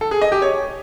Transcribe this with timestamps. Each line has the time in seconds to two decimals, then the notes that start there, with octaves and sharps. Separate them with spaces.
0.01 A4
0.11 G#4
0.22 D#5
0.32 G4
0.42 C#5